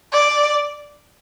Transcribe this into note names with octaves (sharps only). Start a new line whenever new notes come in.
D5